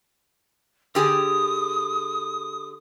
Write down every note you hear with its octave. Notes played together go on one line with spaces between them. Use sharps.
D3 G4 G#4 D#6